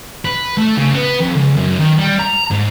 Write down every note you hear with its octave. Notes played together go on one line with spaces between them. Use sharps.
B4
A3
C#3
B3
F2
C#2
F#2
D#3
G3
A#5
G#2